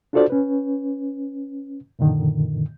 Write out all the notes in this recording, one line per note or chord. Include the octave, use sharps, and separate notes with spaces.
D4 F4 F#4 A4 C5 D5
C#4 B4
F#2 A#2 D3 D#3